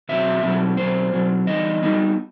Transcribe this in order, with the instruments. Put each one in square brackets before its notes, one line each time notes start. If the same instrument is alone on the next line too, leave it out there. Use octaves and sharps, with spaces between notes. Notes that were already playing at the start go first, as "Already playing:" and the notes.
[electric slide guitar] B2 F#3 C4 E5
B2 F#3 C4
B2 F#3 C4 C5
B2 F#3 C4
E3 G3 B3 D#4 D#5
G3 B3 D#4